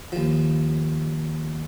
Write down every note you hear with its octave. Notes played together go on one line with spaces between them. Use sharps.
D#2 F3